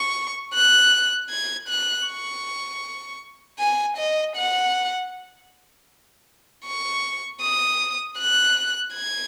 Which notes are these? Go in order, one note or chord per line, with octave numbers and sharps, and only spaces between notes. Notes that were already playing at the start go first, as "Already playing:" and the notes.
Already playing: C#6
F#6
G#6
F#6
C#6
G#5
D#5
F#5
C#6
D#6
F#6
G#6